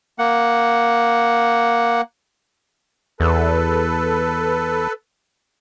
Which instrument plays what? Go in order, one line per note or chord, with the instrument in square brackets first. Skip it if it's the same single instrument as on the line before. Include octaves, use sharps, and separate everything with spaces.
[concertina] A#3 F#5
[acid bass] E2 [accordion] A4 B4